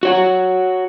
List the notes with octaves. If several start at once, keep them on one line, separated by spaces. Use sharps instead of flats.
F#4 C#5 F#5